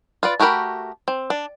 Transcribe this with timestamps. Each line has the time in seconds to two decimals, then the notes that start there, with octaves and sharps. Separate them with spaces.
0.23 F4 B4 D5
0.40 A3 F#4 G4 A#4 B5
1.08 C4
1.30 D4